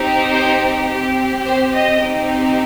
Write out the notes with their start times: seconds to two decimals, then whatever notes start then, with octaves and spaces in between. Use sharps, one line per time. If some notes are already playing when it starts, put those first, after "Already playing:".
Already playing: C4 D#4 G4
0.30 C5
0.87 C4 G4
1.45 C5
1.73 D#5
2.02 C4 D#4 G4